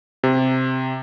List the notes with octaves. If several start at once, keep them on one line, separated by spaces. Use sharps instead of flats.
C3